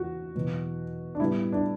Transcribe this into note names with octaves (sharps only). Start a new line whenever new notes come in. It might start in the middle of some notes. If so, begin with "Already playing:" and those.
Already playing: E2 F#3 F#4
E2 B2 F#3
D4
A2 G3 B3 E4
D4